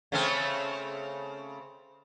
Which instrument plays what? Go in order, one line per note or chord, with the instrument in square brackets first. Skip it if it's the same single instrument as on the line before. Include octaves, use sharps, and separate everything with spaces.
[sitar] C#3 A3 C4